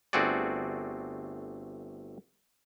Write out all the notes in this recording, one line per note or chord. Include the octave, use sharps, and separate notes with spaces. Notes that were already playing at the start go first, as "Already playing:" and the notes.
G1 A3 C4 F#4 G#4 D5